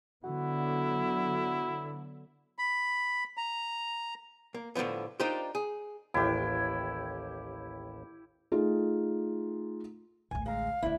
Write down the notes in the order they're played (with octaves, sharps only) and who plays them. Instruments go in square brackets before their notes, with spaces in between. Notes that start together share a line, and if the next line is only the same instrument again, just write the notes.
[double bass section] D3 F#3 B3 [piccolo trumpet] E4 [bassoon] F#4
[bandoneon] B5
A#5
[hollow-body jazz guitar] A#3
A2 D3 E3 F3 B3
D4 D#4 F4 G4 A#4 C5
G#4
[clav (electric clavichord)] A1 D#2 [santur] E4 G4
[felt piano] A3 D#4 F4 G#4
[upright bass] A1 D2 [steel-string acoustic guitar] G#5
[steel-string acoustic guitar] G#3 A#5 [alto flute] F5
[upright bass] D2 D3 [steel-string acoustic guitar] D4 E4